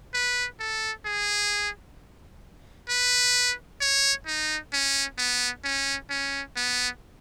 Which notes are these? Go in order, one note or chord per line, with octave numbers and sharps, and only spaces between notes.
B4
A4
G#4
B4
C#5
D#4
C#4
B3
C#4
C#4
B3